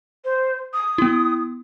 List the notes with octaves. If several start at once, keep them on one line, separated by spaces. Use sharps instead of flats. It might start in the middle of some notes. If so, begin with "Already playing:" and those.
C5
D#6
B3 E4